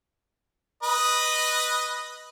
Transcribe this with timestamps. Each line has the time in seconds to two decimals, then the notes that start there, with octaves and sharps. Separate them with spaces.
0.83 B4 D#5